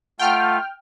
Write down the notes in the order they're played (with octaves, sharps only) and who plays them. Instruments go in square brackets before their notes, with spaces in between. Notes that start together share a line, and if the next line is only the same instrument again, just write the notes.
[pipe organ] A3 F4 [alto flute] F#5 [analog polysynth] G5 F6